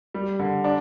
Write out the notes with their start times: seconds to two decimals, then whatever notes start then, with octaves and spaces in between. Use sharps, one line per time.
0.14 G3
0.39 D3
0.64 D4